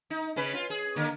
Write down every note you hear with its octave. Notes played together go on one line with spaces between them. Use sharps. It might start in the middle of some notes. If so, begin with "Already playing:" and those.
D#4
C#3 C#4 B4
F4
G#4
D3 A#3